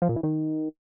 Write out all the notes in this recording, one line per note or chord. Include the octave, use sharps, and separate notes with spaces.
F3
A#2
E3
D#3